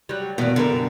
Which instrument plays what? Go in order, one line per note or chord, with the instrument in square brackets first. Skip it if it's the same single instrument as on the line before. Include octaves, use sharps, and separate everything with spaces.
[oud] F#3 G3
[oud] E2 G2 D#3 [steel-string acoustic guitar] B2
[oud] F#2 G3 A#4 [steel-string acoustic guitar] D3